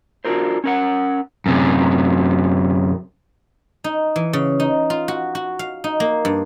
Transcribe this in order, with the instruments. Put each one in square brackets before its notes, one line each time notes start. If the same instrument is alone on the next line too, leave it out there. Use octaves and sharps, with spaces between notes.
[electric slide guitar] D4 F4 F#4 A#4 C5
C#4 A#4 F#5
[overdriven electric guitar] F#2 C3
[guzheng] D#4
E3
C#3
D#4
F4
F#4
F#4
F5
D#4
A#3
G2